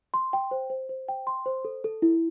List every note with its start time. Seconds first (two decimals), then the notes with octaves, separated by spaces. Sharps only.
0.14 C6
0.33 G5
0.51 C5
0.70 C5
0.89 C5
1.08 G5
1.27 C6
1.46 C5
1.65 A4
1.84 A4
2.02 E4